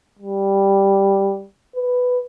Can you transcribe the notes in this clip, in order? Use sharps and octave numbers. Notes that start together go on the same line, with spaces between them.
G3
B4